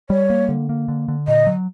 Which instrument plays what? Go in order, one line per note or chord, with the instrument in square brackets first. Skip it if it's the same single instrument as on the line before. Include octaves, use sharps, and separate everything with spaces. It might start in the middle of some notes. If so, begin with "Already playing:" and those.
[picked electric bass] G3 [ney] C#5
[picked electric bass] A#3
D3
A#3
D3
D3
[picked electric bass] A#2 [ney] D#5
[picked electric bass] F#3